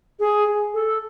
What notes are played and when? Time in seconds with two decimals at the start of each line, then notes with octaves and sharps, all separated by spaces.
0.20 G#4
0.74 A4